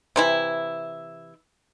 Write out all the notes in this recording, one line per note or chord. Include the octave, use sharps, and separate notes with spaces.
C3 E3 E4